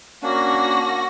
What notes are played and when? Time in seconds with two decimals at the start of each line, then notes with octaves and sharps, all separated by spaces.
0.23 A#3 C#4 D4 F#4 A#6